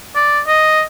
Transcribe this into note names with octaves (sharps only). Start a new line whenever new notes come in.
D5
D#5